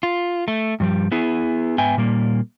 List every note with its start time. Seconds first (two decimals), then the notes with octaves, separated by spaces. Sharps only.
0.03 F4
0.48 A3
0.80 G2 F3 G3
1.12 B3 E4 G#4
1.78 G#2 B3 E5 G5 G#5
1.97 A#2 G3 A#3